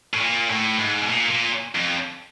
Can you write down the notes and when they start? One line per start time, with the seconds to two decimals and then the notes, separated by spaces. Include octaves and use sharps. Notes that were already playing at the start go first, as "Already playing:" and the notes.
0.14 A2
0.21 A#2
0.49 A2
0.80 G#2
1.01 B2
1.09 A#2
1.31 A#2
1.75 F2